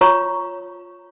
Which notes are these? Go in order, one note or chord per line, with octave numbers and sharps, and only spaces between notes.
F4 C#5 A#5 C#6